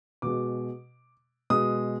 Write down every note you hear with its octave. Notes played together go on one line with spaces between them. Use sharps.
B2 G#3 D6
B2 G#3 D#6